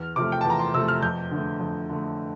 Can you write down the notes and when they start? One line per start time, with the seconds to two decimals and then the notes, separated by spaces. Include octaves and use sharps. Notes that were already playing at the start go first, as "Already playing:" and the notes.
Already playing: E2 F6
0.16 C3 F3 A3 D6
0.32 G5
0.41 E2 A5
0.50 A#5
0.59 C6
0.74 C3 F3 A3 E6
0.88 F6
1.02 F2 G6
1.31 D3 A3
1.60 F2
1.89 D3 A3